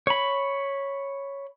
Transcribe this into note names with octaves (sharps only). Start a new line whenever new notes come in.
C#5 B5